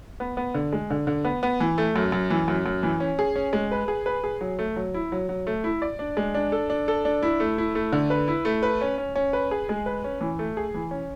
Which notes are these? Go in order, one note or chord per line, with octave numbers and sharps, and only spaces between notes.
B3
B3
D3
G#3
D3
D3
B3
B3
E3
A3
F#2
F#2
E3
F#2
F#2
E3
C#4
G#4
C#4
G#3
B4
G#4
B4
G#4
F#3
A3
F#3
E4
F#3
F#3
A3
E4
D5
D4
G#3
D4
A4
D4
A4
D4
E4
A3
E4
A3
D3
B4
E4
A3
B4
C#4
C#4
C#4
B4
G#4
G#3
B4
C#4
E3
A3
G#4
E3
C#4